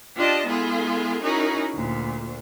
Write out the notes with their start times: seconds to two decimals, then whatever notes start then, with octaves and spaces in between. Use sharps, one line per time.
0.16 D4 F4 G4 D5 D#5 A5
0.47 G#3 B3 E4 F4 G#4 A4
1.23 C#4 D#4 E4 F#4 G#4 A#4
1.75 D2 A#2